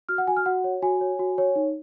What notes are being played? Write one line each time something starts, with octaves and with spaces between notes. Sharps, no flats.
F#4 F6
F#5
F#4 G#5
F6
F#4 F#5
C#5
F#4 G#5
C#5
F#4
C#5
D#4